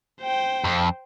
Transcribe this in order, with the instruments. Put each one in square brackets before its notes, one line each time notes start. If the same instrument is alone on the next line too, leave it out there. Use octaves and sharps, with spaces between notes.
[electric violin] C5 G5
[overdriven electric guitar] F2